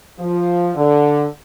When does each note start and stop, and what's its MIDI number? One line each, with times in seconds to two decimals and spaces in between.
0.19 0.71 53
0.76 1.25 50